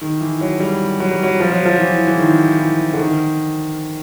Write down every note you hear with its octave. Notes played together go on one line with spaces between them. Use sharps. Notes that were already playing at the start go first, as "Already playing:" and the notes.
D#3
E3
F#3
G3
F#3
G3
F#3
F3
F#3
F3
E3
E3
D#3
E3
D3
D#3